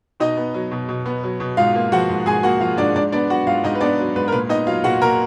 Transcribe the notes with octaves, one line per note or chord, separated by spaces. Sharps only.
B2 D#4 D#5
B3
F#3
B2
B2
B3
F#3
B2
G#2 F4 F5
A#3
F3 F#4 F#5
G#2
G#2 G#4 G#5
A#3 F#4 F#5
F3 F4 F5
G#2 D4 D5
G#2 D4 D5
B3 D4 D5
F#3 F#4 F#5
G#2 F4 F5
G#2 D#4 D#5
B4
B3 D4 D5
F#3
G#2 B4
A#4
A#2 B4
B3 D#4 D#5
F#3 F4 F5
A#2 F#4 F#5
A#2 A#4 A#5